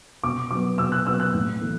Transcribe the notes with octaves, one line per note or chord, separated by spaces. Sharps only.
B2 D6
F#3 B3 D6
B2 E6
F#6
F#3 B3 E6
F#6
A2
E3 A3